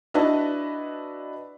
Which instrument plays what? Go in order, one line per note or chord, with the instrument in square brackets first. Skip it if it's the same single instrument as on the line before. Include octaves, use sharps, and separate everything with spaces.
[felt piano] D4 E4 F#4 B4 D#5 A5